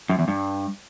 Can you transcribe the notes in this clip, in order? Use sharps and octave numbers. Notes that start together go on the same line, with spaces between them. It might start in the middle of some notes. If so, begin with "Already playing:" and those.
F#2
E2
G2